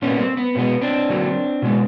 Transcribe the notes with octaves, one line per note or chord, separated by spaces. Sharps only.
A#2 G3 A#3 B3 C#4
C4
B3
B2 G#3 B3 C4
C4 D4
D3 F#3 A#3
B2 G#3 B3